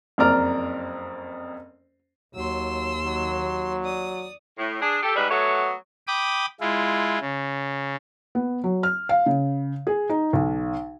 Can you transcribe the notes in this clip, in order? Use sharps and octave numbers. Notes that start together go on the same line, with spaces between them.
F#1 F2 A#4 D5 A#5 F6
D#2 F#3 C6 E6
F#3
D5 D#6
A2
D4 G#4
G4 A4
G#2 G3 G#3 B4
F#3 A3 B3 C#5
G5 B5 D6 D#6
G#3 E4 F4
C#3
B3
F#3
F6
F5
C#3
G#4
D#4
B1